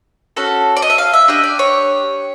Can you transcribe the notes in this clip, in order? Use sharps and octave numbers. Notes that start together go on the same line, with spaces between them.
C#4 F#4 A4
D5
D#5
E5
F5
E5
D4 G4 D#5
D5
C#5